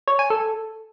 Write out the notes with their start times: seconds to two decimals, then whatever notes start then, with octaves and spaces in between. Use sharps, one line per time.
0.08 C#5
0.19 G#5
0.30 A4